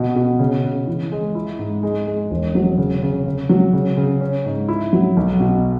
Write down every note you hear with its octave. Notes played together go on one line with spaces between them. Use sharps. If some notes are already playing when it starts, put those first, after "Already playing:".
Already playing: B2
B2
C#3
C#3
E3
G#3
E4
G#2
G#3
G#3
E1
F#3
C#3
C#3
C#3
F#3
C#3
C#3
C#4
G#2
E4
F#3
B1
B2